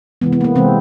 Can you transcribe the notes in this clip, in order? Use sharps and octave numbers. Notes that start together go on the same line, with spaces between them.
C3 E3 G#3 B3
B3
A#3
B3
C3 E3 G#3 C4